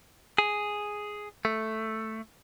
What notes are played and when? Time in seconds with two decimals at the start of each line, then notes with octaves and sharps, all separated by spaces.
0.38 G#4
1.45 A3